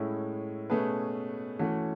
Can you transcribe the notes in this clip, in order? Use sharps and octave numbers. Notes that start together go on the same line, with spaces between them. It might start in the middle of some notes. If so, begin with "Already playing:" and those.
Already playing: A2 G#3 C#4 E4
B2 A3 C#4 G#4 B4
E3 A3 C#4 F#4